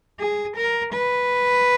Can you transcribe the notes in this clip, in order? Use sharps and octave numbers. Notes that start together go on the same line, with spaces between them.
G#4
A#4
B4